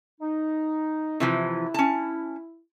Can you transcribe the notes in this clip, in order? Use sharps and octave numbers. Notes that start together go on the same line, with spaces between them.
D#4
C3 E3 F3 E4
C#4 A5